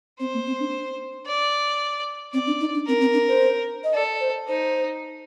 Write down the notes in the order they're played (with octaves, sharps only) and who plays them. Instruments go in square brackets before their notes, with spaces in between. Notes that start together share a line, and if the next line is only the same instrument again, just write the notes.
[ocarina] C4 [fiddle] C5
[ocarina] A#3
C4
D4
[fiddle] D5
[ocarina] C4 [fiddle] D5
[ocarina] D4
D#4
D4
[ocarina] C4 [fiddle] A#4
[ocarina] C4
D4
C5
D#5
[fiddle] A4 [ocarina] D5
[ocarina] C5
[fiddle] D#4 [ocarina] C5